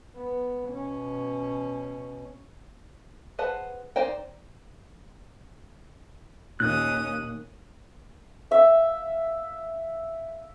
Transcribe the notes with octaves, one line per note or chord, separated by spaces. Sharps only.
B3
B2 C#4
G#4 B4 C5 F#5 A5
D#4 C5 D5 G5
D#2 A#2 C#4 D#6 F#6
E5 F5